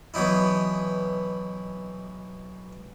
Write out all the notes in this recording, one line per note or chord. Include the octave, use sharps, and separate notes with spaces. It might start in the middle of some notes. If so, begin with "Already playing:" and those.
B2 E3 F#3 D#4 E4